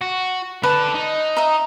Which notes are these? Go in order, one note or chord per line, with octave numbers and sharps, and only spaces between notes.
F#4
D3 B4 A5
D#4
D#5 E5 A#5